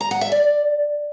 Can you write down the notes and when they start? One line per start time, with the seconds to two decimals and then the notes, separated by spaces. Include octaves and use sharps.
0.01 A#5
0.11 F#5
0.21 E5
0.32 D5